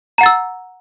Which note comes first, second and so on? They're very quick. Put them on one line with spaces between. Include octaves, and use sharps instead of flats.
A#5 F#5 A6 E6